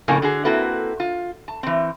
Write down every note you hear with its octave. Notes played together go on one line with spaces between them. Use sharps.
F2 A2 C#3 A#3 G#5
D3 F#4 G#4
A#3 C4 E4 F#4 A4 B4
F4
A5
E3 C4